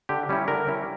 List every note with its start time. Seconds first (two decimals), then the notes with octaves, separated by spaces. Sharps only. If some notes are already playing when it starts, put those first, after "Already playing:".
0.09 D3 G4
0.29 G3 C#4 E4
0.48 D3 A#4
0.67 G3 C#4 E4